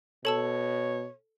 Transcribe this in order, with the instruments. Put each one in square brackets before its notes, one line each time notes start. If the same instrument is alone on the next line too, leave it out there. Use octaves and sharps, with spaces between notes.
[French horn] B2 [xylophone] A4 A5 E6 [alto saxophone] C#5